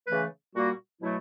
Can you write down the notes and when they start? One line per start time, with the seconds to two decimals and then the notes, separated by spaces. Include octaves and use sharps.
0.07 C#3 E3 A3 B4
0.54 A#2 G3 A#3 F#4
1.01 B2 F#3 A3 E4